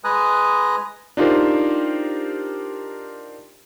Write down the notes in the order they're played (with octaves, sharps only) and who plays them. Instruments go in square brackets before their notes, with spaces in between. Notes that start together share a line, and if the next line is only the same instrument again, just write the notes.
[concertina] G#3 B4 G#5 A#5 D#6 F#6
[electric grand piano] D4 D#4 F4 G4 A#4 C5